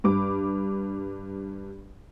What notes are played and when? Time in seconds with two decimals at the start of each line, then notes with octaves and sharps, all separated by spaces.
0.04 G2 D6